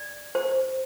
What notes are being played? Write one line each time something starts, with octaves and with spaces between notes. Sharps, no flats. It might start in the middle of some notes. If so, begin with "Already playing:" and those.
Already playing: D5
C5